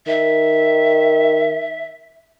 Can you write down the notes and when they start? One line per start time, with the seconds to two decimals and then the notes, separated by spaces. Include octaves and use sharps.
0.07 D#3 E5